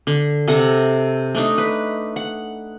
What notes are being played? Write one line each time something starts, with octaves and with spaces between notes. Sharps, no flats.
D3
C3 A4 F#5 A#5
A3 D4 D#4
B4
F#5